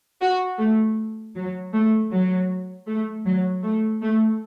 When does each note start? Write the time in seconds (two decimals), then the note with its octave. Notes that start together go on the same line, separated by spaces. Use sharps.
0.21 F#4
0.58 A3
1.35 F#3
1.73 A3
2.11 F#3
2.87 A3
3.26 F#3
3.64 A3
4.02 A3